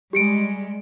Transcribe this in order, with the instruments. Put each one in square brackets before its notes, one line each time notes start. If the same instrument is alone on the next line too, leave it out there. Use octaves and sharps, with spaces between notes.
[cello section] G3 G#3 [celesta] G4 C#7 D7